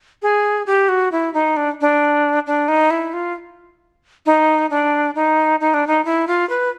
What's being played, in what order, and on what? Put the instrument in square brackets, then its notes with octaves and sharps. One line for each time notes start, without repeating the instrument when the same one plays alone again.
[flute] G#4
G4
F#4
E4
D#4
D4
D4
D4
D#4
E4
F4
D#4
D4
D#4
D#4
D4
D#4
E4
F4
B4